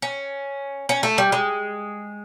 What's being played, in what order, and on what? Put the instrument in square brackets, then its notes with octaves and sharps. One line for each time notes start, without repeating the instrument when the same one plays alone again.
[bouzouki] C#4
C#4
A3
G3
G#3